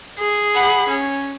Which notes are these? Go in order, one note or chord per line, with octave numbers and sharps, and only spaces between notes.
G#4
F#5 B5
C#4